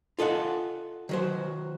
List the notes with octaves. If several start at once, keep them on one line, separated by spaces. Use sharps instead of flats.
F4 A4 D#5 F#5
D#3 F#3 C5